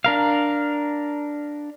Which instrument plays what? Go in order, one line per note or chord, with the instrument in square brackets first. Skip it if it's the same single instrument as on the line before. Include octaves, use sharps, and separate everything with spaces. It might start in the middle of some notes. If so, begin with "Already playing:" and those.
[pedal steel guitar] D4 A#4 F5